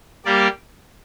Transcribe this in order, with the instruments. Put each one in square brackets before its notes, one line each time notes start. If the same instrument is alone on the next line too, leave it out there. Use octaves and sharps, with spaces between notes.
[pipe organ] G3 A#3 G4 D5